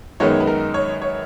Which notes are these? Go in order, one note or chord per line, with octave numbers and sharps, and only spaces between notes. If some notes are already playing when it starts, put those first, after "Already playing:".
F#2 D#3 G#3 B3 D#4 C#5
B4
A#4
C#5
C#5